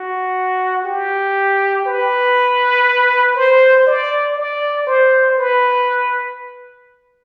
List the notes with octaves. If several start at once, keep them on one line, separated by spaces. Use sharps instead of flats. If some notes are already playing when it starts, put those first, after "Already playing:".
Already playing: F#4
G4
B4
C5
D5
D5
C5
B4